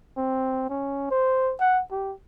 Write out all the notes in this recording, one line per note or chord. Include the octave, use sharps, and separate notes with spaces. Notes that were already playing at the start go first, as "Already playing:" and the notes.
C4
C#4
C5
F#5
G4